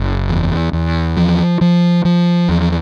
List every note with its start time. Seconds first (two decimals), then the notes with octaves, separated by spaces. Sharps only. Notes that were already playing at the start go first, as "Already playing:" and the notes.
Already playing: F#1
0.29 E2
0.73 E2
1.17 F3
1.61 F3
2.05 F3
2.49 E2